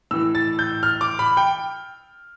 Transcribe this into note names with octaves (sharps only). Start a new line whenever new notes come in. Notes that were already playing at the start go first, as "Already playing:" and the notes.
A2 E3 E6
A6
G6
F6
D6
B5
G5